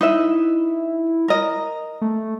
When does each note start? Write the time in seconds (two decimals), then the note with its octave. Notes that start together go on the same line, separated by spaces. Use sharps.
0.01 D#4 E4 B4 E5
1.28 A#4 D#5
2.01 A3